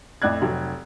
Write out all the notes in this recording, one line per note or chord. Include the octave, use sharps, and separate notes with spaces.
F2 A2 D5 F#6 G#6
F1 F#3